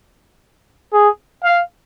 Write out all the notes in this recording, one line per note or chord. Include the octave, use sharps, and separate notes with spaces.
G#4
F5